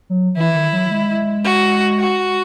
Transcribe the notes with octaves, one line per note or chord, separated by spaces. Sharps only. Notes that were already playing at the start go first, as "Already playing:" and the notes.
F#3
E3 E4
D#3
F#3
G#3
F#4
F#4